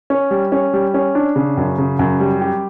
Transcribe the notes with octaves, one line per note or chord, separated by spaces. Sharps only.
C#4
G3
C#4
G3
C#4
D4
C#3
F#2
C#3
F#2
G3
G4